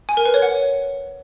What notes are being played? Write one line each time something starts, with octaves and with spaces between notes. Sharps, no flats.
G#5
A#4
B4
C#5
F#5